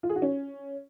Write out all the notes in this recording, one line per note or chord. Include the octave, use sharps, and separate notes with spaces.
F4
G#4
F#4
C#4